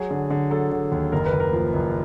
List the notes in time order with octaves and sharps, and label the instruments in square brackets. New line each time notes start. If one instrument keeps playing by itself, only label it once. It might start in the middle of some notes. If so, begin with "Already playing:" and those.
Already playing: [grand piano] F#3 G#4
D3
D3
F#3 A4
D3
D#2
F#1 A#4
B4
F#1
A#4
F3
F#1